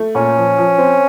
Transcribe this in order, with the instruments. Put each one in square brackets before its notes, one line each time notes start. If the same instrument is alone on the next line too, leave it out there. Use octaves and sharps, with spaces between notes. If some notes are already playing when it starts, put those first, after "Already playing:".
Already playing: [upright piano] A3
[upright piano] A#2 [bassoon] C#4
[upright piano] F3
F3
C4